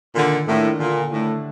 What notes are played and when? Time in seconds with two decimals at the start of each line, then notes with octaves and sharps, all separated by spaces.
0.16 A#2 D3 D#3
0.48 A2 A#3 D4 F4
0.80 A#2 D3
1.11 A2 A3 D4